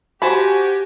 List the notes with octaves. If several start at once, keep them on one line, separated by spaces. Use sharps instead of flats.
F#4 G4 C5 G#5 A5 B5